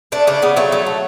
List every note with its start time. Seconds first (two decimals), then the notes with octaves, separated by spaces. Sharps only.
0.12 A3 D4
0.27 C#3 D4
0.42 C#3 B3
0.56 F#3 A3
0.72 F#3
0.87 A3